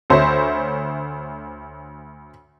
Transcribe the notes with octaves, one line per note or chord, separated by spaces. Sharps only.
D2 C5 C#5 E5